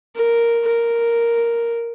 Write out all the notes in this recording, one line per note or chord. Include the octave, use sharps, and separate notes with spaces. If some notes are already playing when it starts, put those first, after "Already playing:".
A#4
A#4